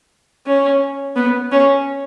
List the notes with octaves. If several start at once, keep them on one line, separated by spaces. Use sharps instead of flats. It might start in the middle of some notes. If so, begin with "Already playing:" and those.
C#4
B3
C#4